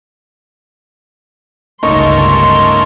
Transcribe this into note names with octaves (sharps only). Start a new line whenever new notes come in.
G1 C#2 A3 A#3 C#4 D#4 C6 C#6